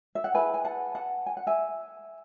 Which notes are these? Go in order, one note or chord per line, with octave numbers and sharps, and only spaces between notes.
E5
F#5
E4 G#4 B4 E5 G#5
G#5
F#5 A5
F#5 A5
G#5
F#5
E5 G#5